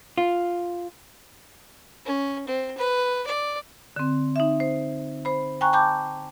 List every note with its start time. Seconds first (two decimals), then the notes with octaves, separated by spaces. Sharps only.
0.18 F4
2.05 C#4
2.47 C4
2.77 B4
3.27 D5
3.96 D3 C4
4.36 D#4 E5
4.60 C5
5.25 C5 B5
5.61 G5 G#5 A#5 C#6 F#6
5.73 G5 A5 B5 D6 G6